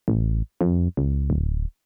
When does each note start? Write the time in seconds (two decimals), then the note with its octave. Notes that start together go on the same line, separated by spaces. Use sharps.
0.08 A1
0.61 F2
0.97 C#2
1.30 D1